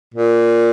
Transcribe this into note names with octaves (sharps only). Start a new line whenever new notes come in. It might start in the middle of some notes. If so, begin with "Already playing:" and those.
A#2